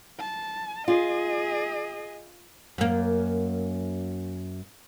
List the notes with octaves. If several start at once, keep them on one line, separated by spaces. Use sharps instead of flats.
A5
F4 G#4 D#5
F#2 A#3